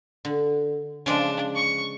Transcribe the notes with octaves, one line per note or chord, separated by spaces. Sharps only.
D3
C#3 F3 G#3 D4
C#6